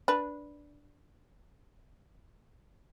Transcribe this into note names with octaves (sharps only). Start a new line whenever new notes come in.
D4 B4